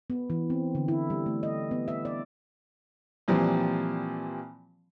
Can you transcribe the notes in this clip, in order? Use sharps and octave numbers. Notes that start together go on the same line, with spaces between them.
B3
E3
C4
D3
E4
G3
A3
D#5
B3
E5
D5
A#2 E3 F3 G3 C4